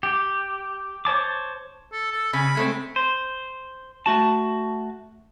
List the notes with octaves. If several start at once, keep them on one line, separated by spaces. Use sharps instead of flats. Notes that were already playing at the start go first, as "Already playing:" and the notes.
G4
C5 C#5 A5 D6
A4
A4
C#3 B5
G#3 A3 C4
C5
A3 F#4 A5